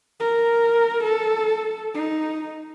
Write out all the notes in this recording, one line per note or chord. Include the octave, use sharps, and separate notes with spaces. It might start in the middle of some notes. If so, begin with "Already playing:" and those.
A#4
A4
D#4